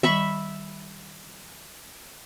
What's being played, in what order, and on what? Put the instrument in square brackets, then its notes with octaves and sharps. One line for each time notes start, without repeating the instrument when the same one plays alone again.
[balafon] D#3 G3 [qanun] E5 B5 C#6